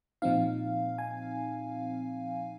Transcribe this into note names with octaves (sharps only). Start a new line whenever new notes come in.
A#2 F3 C4 D#4 F5
G#5